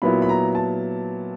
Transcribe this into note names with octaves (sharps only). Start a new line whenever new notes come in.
A#2 F#3 B3 E4 B5
B5
A#5
A5